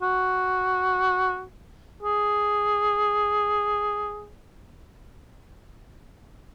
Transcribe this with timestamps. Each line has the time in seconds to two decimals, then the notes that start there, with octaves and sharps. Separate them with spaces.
0.02 F#4
2.03 G#4